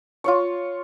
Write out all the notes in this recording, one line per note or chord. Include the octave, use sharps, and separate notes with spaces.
F4 C#5 C#6